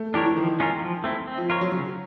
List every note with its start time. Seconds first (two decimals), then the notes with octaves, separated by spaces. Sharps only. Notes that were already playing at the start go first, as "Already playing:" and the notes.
Already playing: A3
0.14 E3 D4 G4 A#4 C#5
0.26 E3
0.36 D#3 F3
0.60 G#3 C#4 F4 A#4
0.82 F3
1.04 A3 C4 E4
1.28 C4
1.38 F3
1.50 F4 A#4 C#5
1.61 F#3
1.72 C#3 F#3